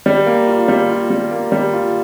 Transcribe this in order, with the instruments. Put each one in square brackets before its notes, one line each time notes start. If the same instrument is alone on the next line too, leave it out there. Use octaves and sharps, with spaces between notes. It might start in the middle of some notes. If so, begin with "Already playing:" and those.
[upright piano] G3
A#3
F4
G3
F4
G3
A#3
G3
F4